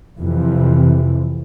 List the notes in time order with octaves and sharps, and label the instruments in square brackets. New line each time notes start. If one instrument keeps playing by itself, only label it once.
[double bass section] F2 C3 E3